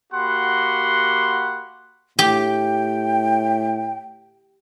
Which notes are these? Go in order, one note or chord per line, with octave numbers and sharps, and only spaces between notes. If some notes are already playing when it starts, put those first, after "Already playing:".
A#3 F#4 G4 F#5 B5 C6
A2 G4 G5